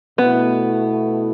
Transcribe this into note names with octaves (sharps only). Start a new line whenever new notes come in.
B2 A3 B3 E4